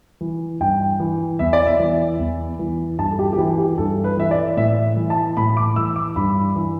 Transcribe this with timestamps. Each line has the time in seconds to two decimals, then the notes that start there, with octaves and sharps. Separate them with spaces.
0.21 E3
0.60 G2 G5
1.00 E3
1.39 E2 E5
1.53 D5
1.66 E5
1.79 E3
2.19 E2
2.59 E3
2.98 G2 A5
3.10 A4
3.19 G4
3.33 G4
3.38 E3 E4
3.58 G4
3.78 G2 A4
4.04 B4
4.17 E3 E5
4.31 D5
4.57 A2 E5
4.97 E3
5.10 A5
5.37 A2 B5
5.57 D6
5.76 E3 E6
5.96 D6
6.16 G2 B5
6.56 E3